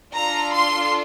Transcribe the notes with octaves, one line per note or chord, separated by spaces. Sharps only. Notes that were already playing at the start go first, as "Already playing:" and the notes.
D4 F4 A4 A#5
C6